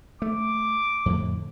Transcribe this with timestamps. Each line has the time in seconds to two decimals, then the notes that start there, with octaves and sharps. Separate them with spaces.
0.22 A3 D6
1.06 F2 A2 D3